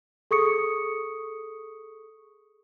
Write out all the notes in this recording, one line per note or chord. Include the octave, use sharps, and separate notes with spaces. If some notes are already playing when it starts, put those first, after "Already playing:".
G#4 A4 C#6 D#6 C#7